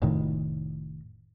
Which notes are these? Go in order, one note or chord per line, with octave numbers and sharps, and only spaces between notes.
F1 A2 D#3